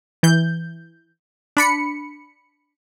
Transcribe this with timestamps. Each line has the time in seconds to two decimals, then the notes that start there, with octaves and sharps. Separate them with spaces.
0.23 E3 G6
1.57 D4 B5 C#7